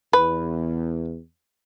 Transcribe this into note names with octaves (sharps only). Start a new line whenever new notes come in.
E2 B4